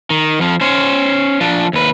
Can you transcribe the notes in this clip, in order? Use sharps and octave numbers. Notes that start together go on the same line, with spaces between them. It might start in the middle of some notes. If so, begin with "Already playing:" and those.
D#3
F2 F3
C#4 C5
F3 D4
D#2 B4